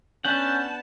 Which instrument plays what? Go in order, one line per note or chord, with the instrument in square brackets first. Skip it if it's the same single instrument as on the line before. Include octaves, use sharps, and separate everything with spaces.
[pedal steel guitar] B3 D4 F#5 [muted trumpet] C#4 [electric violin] A5 [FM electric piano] G6